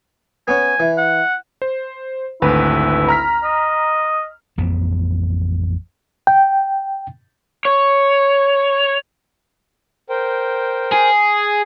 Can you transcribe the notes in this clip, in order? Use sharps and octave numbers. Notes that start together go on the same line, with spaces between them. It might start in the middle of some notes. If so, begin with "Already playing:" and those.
B3 C#4 G#5
E3
F#5
C5
G#1 D2 E4 B4
A#5 F6 B6
D#5
A1 F2 B3
G5
C#5
A#4 C5 G5
G#4